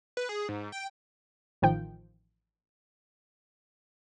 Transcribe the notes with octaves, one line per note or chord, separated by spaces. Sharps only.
B4
G#4
G#2
G5
A1 D#3 F3 G5